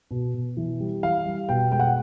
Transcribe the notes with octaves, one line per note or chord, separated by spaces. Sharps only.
B2
B2
E3
G3
E3 F5
G3
B2 G5
G#3 G5
F#5